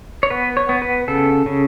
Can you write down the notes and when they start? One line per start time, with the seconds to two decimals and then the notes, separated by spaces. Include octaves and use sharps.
0.23 C#5
0.30 B3 B4
0.57 C#5
0.69 B3
0.82 B4
1.08 C#3 A4
1.46 C#3